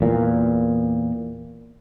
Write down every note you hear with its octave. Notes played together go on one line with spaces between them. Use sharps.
E2 A#2